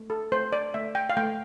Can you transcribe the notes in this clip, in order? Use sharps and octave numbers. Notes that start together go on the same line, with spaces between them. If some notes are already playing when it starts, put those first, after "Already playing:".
Already playing: A3
A4
A3 C5
D5
A3 E5
G5
F5
A3 G5